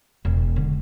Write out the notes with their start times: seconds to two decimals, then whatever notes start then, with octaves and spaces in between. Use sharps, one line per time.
0.25 E1
0.56 D3